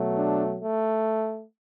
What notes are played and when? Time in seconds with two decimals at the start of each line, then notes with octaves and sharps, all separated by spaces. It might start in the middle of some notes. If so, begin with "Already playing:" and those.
Already playing: B2 F#3 A3
0.18 D4
0.61 A3